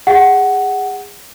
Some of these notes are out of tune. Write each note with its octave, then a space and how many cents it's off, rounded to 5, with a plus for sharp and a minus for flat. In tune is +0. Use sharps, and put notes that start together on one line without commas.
G#4 -25 F#5 +10